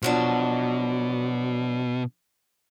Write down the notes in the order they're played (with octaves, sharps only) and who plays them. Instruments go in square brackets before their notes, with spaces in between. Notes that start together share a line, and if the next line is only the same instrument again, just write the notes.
[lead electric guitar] B2 [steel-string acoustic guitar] F3 F#3 D4